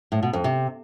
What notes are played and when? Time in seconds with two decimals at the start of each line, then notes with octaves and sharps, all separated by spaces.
0.12 A2
0.23 B2
0.33 F2
0.44 C3